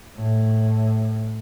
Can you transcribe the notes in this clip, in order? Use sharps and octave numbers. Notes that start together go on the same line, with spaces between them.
A2